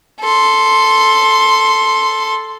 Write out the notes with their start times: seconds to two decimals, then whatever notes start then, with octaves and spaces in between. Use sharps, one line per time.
0.21 A4 C6